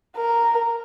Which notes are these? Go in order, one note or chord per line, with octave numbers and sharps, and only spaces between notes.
A#4